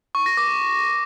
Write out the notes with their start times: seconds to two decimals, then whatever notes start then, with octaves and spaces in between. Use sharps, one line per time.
0.15 C#6
0.26 A#6
0.37 D6